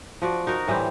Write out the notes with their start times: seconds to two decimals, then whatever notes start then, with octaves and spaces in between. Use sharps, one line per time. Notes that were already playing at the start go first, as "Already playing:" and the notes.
0.22 F3 F#4 D5
0.47 D#4 F#4 A#4
0.68 A2 E3 G3 C4